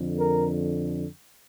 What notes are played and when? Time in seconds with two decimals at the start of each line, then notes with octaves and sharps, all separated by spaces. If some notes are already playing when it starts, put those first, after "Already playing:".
Already playing: F2 D3
0.20 A#4